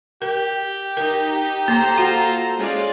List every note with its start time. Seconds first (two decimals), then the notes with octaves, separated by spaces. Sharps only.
0.22 G4 A#4
0.97 D#4 A#4
1.68 A#3 A4 C5 A#5
1.98 F4 F#4 F#5
2.58 G#3 C#4 F4 D5